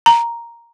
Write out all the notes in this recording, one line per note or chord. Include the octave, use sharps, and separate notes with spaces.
A#5